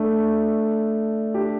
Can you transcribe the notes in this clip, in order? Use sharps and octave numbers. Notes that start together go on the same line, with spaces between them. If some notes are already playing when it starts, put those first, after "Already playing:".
Already playing: A3 D4
D4 G4